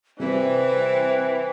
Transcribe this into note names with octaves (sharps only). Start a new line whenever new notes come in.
C3 E3 G3 C4 E4 B4